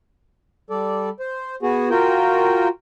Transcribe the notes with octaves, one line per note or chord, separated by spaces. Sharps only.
G3 A4 D5
C5
B3 F#4 G#4
F4 F#4 A#4 G5